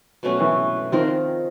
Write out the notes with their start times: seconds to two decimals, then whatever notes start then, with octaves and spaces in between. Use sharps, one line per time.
0.23 B2 F#3 A3 C#4
0.40 E3
0.92 D#3 F3 C4 F4 A#4